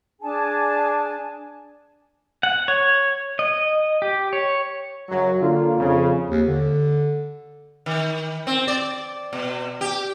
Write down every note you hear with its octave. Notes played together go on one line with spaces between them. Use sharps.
D4 G#4 G#5 A5
F#5
C#5
D#5
G4
C#5
F#2 C#3 F#3
D3 A#3 F4
F2 C#3
D#2
D3
D#3
C4
D5
B2
G4